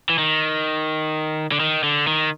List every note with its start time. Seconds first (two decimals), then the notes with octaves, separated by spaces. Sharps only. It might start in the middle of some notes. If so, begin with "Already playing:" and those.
0.10 E3
0.18 D#3
1.52 D3
1.60 D#3
1.83 D3
2.07 D#3